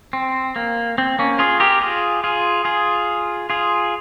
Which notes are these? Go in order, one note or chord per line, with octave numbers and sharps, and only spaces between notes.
C4
A#3
C4
A#3 C#4
F4 G#4
G4 A#4
F4 G#4
F4 G#4
F4 G#4
F4 G#4